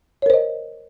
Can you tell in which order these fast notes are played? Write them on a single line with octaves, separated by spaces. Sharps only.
C#5 A#4 C5 D#5